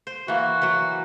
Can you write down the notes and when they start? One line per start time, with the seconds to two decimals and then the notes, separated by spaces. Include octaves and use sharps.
0.07 C5
0.28 E3 A#3 F#4
0.62 E3 F#3